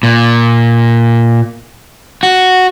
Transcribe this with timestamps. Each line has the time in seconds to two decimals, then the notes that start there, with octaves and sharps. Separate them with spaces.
0.03 A#2
2.23 F#4